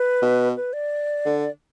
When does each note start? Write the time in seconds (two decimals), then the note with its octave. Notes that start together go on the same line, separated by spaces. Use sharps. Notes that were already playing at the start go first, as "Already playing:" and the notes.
Already playing: B4
0.22 B2
0.56 B4
0.73 D5
1.25 D3